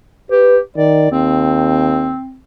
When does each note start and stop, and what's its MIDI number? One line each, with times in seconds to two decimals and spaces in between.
0.31 0.60 67
0.31 0.59 71
0.77 1.07 51
0.77 1.10 74
1.11 2.17 39
1.11 2.39 60